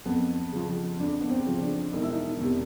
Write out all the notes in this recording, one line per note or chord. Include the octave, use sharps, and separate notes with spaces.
F2 B3
C#3 F3
F2 D4
B3
C4
C#3 F3
D4
E1 D#4
E4
D#4
E2 C3